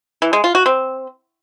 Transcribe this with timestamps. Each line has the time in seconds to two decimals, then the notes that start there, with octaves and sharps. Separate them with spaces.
0.22 E3
0.33 G#3
0.44 F4
0.55 F#4
0.66 C4